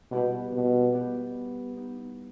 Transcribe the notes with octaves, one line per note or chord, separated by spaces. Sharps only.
B2 G3 B3 E4 G4 B4
B2
G3 B3 E4 G4 B4
B3 D#4 G4